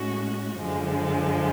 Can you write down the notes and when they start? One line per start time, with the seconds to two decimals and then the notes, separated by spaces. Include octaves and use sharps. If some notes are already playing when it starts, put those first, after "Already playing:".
Already playing: A2 G#3 C#4 F#4
0.58 F#2 D3 F3 G#3